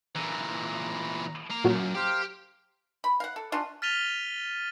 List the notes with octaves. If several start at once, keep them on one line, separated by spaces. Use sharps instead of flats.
A#2 E3 A#5
A#3 F5 A#5
B1 F#2 A#2 F#3
G4 A#4 C5 F5
B5
F5 F#5
A4
C#4 D4 F4
F6 A6 B6 D#7 F7 G7